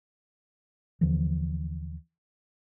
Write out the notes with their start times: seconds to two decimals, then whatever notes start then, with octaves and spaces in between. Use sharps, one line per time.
1.01 D#2 D3 E3 F3